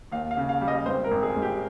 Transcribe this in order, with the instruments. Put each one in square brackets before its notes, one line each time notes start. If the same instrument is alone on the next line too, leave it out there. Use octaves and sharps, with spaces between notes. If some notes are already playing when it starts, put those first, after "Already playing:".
[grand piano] D#2 F5
F5
C#3
F5
G3
D#5
G#1 C5
A#4
G#1
G#4
G#1
G4